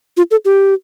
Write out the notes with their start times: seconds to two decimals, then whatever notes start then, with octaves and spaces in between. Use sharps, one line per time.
0.17 F4
0.31 A4
0.45 G4